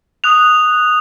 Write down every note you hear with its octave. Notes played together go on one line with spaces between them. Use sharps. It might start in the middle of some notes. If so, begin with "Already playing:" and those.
D#6 F#6 F7